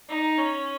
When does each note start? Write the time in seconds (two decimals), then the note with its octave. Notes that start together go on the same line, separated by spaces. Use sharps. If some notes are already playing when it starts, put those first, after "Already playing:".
0.09 D#4
0.38 C#4